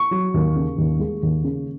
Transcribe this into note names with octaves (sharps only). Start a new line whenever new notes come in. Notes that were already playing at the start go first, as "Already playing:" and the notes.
Already playing: C#6
F#3
D#2
C#3
D#2
G#3
D#2
C#3